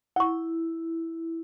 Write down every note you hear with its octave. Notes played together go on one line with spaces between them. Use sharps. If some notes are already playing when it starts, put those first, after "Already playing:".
E4 F#5 C#6